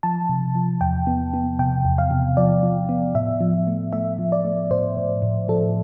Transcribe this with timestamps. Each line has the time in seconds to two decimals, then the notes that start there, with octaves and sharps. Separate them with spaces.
0.03 F3 A5
0.29 C3
0.55 F3
0.81 E2 G5
1.07 B3
1.34 B3
1.59 C3 G5
1.85 E2
1.98 F5
2.11 C3
2.37 F3 D5
2.63 F3
2.89 B3
3.15 A2 E5
3.41 F3
3.67 A3
3.93 A3 E5
4.18 F3
4.32 D5
4.45 A3
4.70 A2 C5
4.97 A2
5.22 A2
5.48 F3 A4